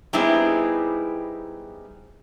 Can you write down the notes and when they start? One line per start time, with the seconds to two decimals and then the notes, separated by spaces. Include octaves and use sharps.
0.13 G3 B3 C4 D#4 E4 G#4